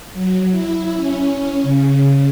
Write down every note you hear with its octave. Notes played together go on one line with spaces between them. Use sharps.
F#3
E4
C#4
C#3